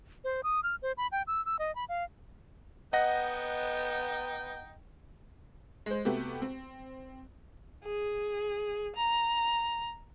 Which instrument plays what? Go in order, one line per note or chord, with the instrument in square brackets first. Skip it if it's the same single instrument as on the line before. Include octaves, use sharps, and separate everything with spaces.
[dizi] C5
D#6
F6
C5
B5
G5
E6
E6
D#5
B5
F5
[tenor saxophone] B3 [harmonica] D#4 G5 [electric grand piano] D#5 F#5 A#6
[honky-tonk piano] G#3 C5
C3 A3 B3 F#4 G4
C4
[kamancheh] G#4
A#5